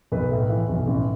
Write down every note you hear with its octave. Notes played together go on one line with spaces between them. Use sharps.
B1 B4
A2
E3
B1
A1